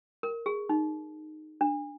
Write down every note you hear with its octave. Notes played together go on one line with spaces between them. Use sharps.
A#4
G#4
D#4
D4